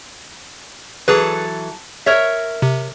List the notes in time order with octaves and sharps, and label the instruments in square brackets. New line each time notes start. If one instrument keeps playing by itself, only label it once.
[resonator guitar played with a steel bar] E3 F#3 A4 [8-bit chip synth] G#4 B4
[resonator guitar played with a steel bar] A#4 C#5 E5
[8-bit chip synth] C3